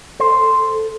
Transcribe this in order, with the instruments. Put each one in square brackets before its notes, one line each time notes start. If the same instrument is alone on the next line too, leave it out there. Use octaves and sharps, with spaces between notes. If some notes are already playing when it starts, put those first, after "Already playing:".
[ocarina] A4 [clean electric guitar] C5